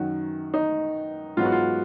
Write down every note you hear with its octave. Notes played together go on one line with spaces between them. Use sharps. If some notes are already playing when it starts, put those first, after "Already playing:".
Already playing: F#2 D#3 F#3 F#4
D#4
G#2 F#3 B3 F4
F#4
F4